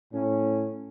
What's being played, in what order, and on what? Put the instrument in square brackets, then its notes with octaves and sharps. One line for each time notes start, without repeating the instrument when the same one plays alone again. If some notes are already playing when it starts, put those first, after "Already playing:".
[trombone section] A2 C#4